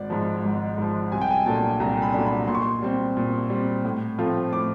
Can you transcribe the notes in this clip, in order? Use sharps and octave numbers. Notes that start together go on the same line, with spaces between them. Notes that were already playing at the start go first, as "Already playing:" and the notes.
Already playing: G#1 D5
G#2 F3
G#1
G#2 F3
C2 G#5
G5
G#5
A#2 F#3 A3 D4 A5
C2 A#5
B5
A#2 F#3 A3 D4
B5
A#2 C6
C#6
C6
G3 C4
A#2
G3 C4
A2
F3 A3 C4 F4
A2 D6